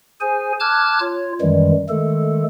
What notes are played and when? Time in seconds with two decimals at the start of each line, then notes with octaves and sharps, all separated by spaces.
0.21 G#4 C5 G#5
0.60 A5 D6 F6 F#6 G#6
1.00 F4 C#5
1.41 F#2 D#3 E3 G3 G#3
1.89 D#3 G#3 A3 A4